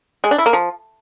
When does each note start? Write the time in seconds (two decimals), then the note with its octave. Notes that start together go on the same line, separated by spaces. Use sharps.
0.24 G#3
0.31 D4
0.38 E4
0.46 A#3
0.53 F3